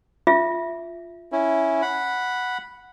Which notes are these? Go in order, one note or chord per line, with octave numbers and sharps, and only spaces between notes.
F4 E5
C#4 E4
F#5 B5